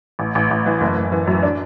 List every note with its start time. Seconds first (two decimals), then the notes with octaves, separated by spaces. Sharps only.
0.19 A1
0.35 A1
0.51 A1
0.66 E3
0.81 F#1
0.97 F#1
1.12 E3
1.27 F#2
1.42 D4